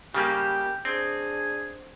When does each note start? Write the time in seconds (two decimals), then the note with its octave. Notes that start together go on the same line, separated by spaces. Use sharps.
0.14 C#3 G3 A#3 G4
0.85 C4 D4 G#4